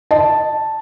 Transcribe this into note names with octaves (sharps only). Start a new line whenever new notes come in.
D#5 A5